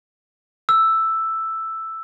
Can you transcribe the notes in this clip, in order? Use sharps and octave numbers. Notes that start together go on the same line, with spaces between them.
E6